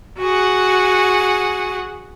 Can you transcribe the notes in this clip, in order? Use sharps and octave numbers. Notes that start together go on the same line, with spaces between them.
F#4 G#4 F#5